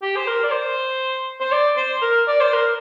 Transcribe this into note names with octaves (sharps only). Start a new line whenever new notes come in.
G4
C5
A#4
D5
C5
C5
D5
C5
A#4
D5
C5
A#4